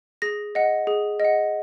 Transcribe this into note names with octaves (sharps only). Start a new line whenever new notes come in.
G#4 A#6
D#5 F#5
G#4
D#5 F#5